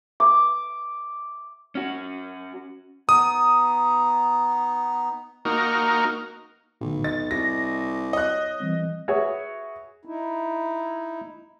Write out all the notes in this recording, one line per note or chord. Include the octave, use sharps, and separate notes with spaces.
D6
C#4 F#4
B3 D#4 D#6
A#3 D#4 F#4 A#4
B1 A2 D3
D#5 A6
C2 A#6
C#5 D#5 F#6
E3 G3 C4
F#4 G#4 B4 C#5 E5
D#4 E4